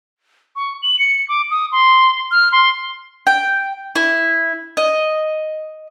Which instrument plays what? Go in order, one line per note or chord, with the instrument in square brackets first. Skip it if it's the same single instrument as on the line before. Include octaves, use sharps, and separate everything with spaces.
[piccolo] C#6
F#7
C#7
D6
D#6
C6
F6
C6
[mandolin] G5
E4
D#5